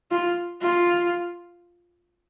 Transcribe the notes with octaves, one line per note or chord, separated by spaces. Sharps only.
F4
F4